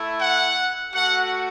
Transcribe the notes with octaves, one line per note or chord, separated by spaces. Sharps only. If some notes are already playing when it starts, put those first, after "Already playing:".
Already playing: A3 E4
F#5
A3 F#4 F#5